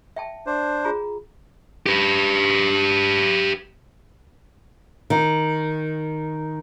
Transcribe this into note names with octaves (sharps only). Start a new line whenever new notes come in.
E5 G5 A5
D4 C5
F4 G#4 A#5
G4 B4
D#3